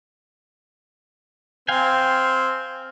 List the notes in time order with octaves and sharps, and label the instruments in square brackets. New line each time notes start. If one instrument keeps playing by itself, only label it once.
[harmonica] C4 [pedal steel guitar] F5 G5 G#5